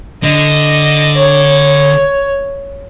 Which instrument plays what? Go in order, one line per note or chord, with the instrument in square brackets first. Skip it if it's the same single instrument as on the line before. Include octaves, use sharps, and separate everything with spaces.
[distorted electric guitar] D3 [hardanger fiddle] D#5
[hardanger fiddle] C#5